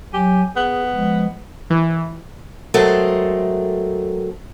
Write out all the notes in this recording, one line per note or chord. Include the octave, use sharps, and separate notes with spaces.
F#3 G4 G#5
B3 G#4
F3 G#3
E3
F#3 G#3 A3 C4 A4 A#4